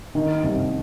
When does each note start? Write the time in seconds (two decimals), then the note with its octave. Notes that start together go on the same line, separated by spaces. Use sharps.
0.15 D#3
0.44 C2